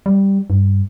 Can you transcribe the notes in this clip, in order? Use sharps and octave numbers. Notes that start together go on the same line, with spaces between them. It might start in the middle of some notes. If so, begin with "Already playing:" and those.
G3
G2